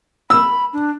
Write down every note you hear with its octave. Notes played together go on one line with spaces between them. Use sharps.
B5 E6
D4